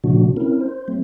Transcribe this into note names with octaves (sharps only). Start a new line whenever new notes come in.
A#2 C#3 F3 A3 D4 F#4
C4 C#4 E4 A#4
C5
F#3 A3 C4